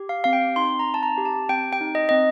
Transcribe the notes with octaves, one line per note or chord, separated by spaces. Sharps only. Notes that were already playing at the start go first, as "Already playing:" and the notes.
Already playing: G4
F5
C4 F5
G5
D#4 C6
A#5
C4
A5
A#5
G4
A5
C4 G5
G5
D#4
D#5
C4 D#5